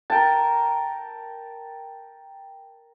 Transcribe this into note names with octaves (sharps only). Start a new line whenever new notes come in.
A#4 G5 A5